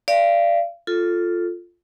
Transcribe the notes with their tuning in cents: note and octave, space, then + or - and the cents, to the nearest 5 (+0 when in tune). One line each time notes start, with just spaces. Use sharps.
D5 +0 F5 -30
F4 +0 A4 +0